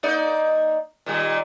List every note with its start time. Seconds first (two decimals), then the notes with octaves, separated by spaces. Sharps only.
0.03 A#3 D#4 D5
1.06 A#2 D#3 G3